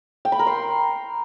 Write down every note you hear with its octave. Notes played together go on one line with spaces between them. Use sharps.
G5
B5
A#4
C6